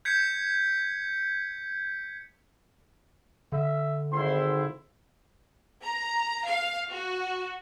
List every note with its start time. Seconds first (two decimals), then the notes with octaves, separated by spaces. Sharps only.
0.05 G6 G#6 B6 C#7
3.52 D3 E5
4.13 G#1 C4 E4 C6
5.84 A#5
6.45 F5
6.90 F#4